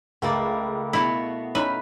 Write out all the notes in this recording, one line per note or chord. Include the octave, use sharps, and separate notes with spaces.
C#2 A3 A#3 D5
B2 A3 B3 E4
C#4 D#4 B4 E5 B5